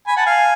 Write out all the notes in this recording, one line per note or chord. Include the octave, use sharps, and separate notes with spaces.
G#5 B5
F#5 A5
F5 G#5